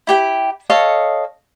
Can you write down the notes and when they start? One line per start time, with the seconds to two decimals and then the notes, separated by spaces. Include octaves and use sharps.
0.07 E4 G4 G5
0.70 A4 C#5 D#5 F5